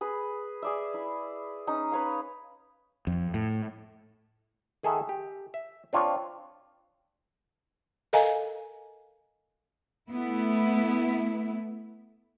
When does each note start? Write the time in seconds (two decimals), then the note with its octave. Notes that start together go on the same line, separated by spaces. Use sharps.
0.01 G#4 B4
0.62 G#4 D5 E5
0.94 E4
1.67 C#4 D#4 A#5
1.92 B4 C#5 F5
3.07 F2
3.34 A2
4.83 D#3 G#4 A4 E5 F#5
5.09 G4
5.54 E5
5.93 C4 D4 F4 C#5
8.13 A4 A#4 D#5 F5 G#5 A#5
10.10 A3 B3 E4